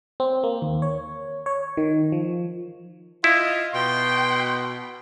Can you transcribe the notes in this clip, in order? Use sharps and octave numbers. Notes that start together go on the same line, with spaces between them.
C4
A#3
D#2
C#5
C#5
D#3
F3
E4 F4 D#5
B2 G5 C6